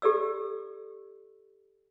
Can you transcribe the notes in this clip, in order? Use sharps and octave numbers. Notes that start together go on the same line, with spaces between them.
G4 A4 D5 E6